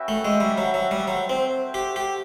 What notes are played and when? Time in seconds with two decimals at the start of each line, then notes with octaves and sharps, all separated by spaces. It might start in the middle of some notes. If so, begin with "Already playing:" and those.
Already playing: C#4 F#4 B4 E5 G5
0.08 A3
0.25 G#3
0.40 G3
0.58 F#3
0.74 F#3
0.91 G3
1.07 F#3 F#4 A4 C5 E5 G5
1.30 C4
1.74 G4
1.96 G4